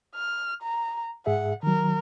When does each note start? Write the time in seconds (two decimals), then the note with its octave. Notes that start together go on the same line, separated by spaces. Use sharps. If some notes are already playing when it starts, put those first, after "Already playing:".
0.15 F6
0.62 A#5
1.26 G#2 G#4 E5 F#5
1.63 D#3 F#3 A#4